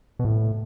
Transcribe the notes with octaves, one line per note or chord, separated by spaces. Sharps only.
B2
A2